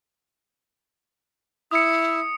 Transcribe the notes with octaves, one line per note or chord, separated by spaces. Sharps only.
E4 D#6 C#7